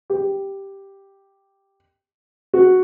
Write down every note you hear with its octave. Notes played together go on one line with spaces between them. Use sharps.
G4
F#4